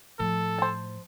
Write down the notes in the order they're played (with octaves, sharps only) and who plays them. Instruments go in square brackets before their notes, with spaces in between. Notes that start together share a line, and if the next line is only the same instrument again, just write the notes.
[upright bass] A2 F3 [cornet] A4
[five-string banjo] C5 A5